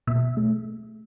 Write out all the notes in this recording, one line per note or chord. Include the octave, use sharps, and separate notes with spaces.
B2 E5
A3